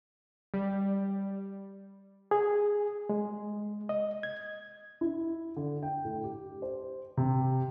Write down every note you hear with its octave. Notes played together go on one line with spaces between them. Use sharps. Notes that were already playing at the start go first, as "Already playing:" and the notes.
G3
G#4
G#3
D#5
G#6
E4
D3
G5
A2
G4
C5
C3